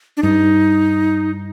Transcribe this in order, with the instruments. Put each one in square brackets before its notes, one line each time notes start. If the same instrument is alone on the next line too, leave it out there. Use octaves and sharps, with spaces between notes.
[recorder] D4
[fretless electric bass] G2 [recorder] D#4